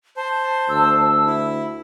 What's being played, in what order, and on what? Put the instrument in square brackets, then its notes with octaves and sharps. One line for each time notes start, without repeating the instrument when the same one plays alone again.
[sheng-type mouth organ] C5 [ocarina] A5
[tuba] D2 [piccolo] E6
[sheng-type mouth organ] E4